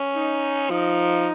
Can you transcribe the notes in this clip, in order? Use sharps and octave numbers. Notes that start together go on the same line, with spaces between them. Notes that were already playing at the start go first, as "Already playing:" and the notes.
Already playing: C#4
D#4
F3 D#4